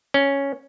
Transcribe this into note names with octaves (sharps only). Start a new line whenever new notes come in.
C#4